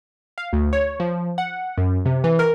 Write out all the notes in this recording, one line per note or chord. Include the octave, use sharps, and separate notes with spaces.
F5
D2
C#5
F3
F#5
F#2
C3
E3
A#4